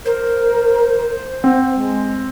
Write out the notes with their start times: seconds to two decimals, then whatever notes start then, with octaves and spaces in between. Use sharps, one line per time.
0.06 A#4 C5
1.44 C4 F#5
1.76 G#3